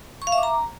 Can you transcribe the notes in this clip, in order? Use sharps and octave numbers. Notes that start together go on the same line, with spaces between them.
C#6
F5
E5
D6
A#5